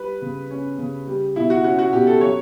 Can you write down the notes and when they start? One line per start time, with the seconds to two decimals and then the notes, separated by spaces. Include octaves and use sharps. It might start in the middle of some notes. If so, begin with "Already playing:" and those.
Already playing: G3 B4
0.22 C#3
0.50 C#4
0.78 C#3
1.07 G3
1.36 B2 E4
1.50 F#4
1.64 C#4 F#4
1.79 F#4
1.93 B2 G4
2.07 A4
2.21 F#3 C#5